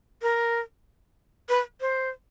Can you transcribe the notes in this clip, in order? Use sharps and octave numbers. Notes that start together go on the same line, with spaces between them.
A#4
B4
C5